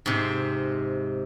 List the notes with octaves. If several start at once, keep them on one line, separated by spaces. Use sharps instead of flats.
G#2 C3